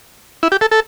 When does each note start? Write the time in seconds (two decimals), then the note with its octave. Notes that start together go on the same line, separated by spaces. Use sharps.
0.43 E4
0.52 G4
0.61 A4
0.71 A4